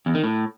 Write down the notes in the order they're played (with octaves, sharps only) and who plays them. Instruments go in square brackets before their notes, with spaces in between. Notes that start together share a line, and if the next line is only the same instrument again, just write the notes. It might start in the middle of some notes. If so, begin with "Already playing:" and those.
[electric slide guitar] E2
D#3
A2